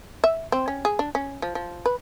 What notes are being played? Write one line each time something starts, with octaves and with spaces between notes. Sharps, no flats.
E5
C4
C#4
G#4
D4
C#4
F3
F3
B4